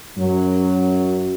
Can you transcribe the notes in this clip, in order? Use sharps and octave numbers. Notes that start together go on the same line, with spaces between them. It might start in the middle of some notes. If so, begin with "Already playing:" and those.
F#2 F#3